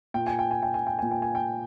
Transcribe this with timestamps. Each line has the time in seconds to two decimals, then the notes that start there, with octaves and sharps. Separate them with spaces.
0.14 A#2 G5
0.27 G#5
0.39 G5
0.51 G#5
0.63 G5
0.74 G#5
0.87 G5
0.99 A#2 G#5
1.11 G5
1.22 G#5
1.35 G5